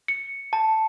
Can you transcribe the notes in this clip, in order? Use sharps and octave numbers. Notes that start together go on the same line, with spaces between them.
C#7
A5